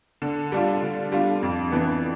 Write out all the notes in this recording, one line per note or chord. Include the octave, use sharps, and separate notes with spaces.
D3
G3 D4 F4
D3
G3 D4 F4
F2
E3 B3 D4